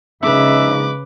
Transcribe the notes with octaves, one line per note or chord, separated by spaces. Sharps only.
A#1 C#3 G#3 D#4 B4 E5 D6